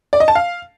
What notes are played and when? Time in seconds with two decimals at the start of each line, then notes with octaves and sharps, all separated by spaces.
0.13 D5
0.20 D#5
0.28 A5
0.35 F5